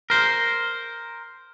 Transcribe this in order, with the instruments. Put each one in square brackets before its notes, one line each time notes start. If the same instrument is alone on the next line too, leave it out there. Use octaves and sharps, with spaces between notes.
[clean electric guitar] A#4 C5